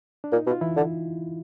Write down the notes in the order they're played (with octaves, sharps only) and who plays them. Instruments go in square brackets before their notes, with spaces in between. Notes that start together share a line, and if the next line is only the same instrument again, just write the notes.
[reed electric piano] D4
[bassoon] A#2 [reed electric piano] D#4
[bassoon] B2
[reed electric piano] F4
E3 E4
[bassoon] D3